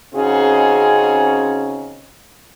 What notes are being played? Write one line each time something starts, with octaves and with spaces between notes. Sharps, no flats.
C#3 C4 C#4 D#4 F#4 G#4